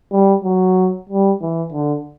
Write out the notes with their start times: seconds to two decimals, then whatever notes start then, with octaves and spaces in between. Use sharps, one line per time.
0.12 G3
0.44 F#3
1.09 G3
1.41 E3
1.72 D3